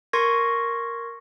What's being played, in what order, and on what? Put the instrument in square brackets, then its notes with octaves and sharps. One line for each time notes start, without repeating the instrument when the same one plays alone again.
[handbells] A#4 C6 C#6 G#6 A#6